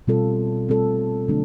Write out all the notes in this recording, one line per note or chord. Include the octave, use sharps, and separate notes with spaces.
B2 G3 C4 F4 A4
B2 G3 C4 F4 A4
D3 F#3 A3 D4